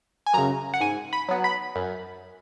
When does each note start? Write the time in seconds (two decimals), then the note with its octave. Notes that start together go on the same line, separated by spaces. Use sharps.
0.27 G#5
0.34 F#2 C#3 A#5
0.74 F#5
0.80 G#2 G#5
1.13 B5
1.29 F#3 B3
1.44 B5
1.76 F#2